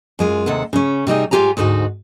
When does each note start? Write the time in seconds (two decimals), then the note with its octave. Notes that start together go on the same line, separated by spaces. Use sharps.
0.19 F#2 G#3 F4
0.46 D#2 C3 G#3 A4 F#5
0.73 C#3 C#4
1.07 C3 G3 D#4 G#4
1.31 G#2 G3 F4 G4 G#5 A#5
1.57 D2 G#2 D#4 F#4